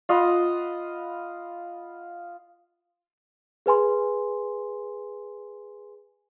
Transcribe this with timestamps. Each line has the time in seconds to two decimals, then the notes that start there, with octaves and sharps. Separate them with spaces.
0.09 F4 D#5 F#5 B5
3.66 G#4 B4 G#5 C6